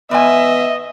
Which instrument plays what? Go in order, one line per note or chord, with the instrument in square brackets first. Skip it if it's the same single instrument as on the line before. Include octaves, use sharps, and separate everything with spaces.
[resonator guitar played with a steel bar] E2 G#2 G#5 [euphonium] B3 [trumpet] D#5 [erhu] E5